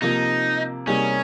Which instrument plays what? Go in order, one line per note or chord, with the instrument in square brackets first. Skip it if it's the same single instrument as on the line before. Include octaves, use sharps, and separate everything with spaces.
[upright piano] C3 F3 A#3 [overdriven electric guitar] D#4
[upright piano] C3 G3 A#3 D#4 G#4 [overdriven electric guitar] C#4